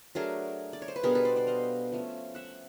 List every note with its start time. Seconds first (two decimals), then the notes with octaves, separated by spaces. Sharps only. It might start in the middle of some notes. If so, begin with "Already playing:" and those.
0.15 F#3 A3 D4 G#4 A#4
0.73 D5
0.82 C#5
0.88 C5
0.96 B4
1.03 B2 G3 B3 D4 G#4 A#4
1.15 A4 B4
1.25 C5 D5
1.36 C5 D5
1.47 D#5 F5
1.92 F3 A3 C#4
2.35 E5 F#5